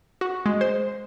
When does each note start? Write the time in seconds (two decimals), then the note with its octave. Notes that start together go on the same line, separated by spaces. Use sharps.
0.21 F#4
0.46 G#3
0.61 C5